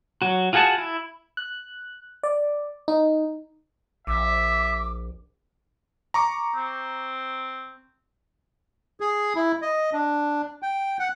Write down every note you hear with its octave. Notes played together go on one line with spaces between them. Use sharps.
F#3 F#4
F4 F#4 G#4 F#5 A5
E4
F#6
D5
D#4
A#1 E5 D6
A#5 C#6 D6
C4
G#4
E4
D#5
D4
G5
F#5